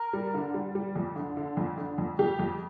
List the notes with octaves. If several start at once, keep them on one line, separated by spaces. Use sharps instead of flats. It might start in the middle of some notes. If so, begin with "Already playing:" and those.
Already playing: A#4
G3
D3
G3
G3
F2
D3
D3
F2
D3
F2
F2 G4
F2